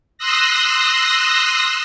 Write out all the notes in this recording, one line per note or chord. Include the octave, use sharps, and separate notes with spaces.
C6 D#6 E6 F#6 A#6